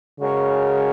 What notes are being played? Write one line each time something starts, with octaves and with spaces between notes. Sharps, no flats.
C#3 G#3 F#4 A#4 C#5